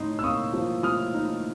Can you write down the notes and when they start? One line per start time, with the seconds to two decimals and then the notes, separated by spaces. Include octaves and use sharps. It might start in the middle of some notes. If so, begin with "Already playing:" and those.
Already playing: A2 D#4 C6
0.19 E6
0.24 A#3 C#6 D#6
0.53 F3
0.83 F3 D#6 F6
1.14 D#4